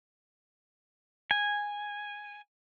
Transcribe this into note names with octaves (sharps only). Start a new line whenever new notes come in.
G#5